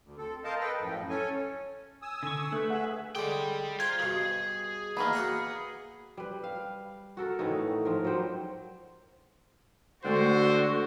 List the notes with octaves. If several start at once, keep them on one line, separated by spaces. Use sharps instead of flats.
D2
C4 A4
A#4 C5 D#5 F5 A5
A4 B4 D#5 G5
F#2 A2 F3
C#4 A4 C#5 G#5
G#5 D#6 E6
D3 C#6
A3 B4
G#4 E5 F#5
D3 G#3 C#4 D5 G5
F4 C5 A#5 G#6
G2 B2 G#4
D#3 E3 A#3 B3
F#4 F#5 A#5
G3 B4
F5
F#4 A4 A#4
A2 E3 A3 D#4
G#2 F3 A#4
F#3 G3 C5 G5
D3 G#3 A3 F#4 C5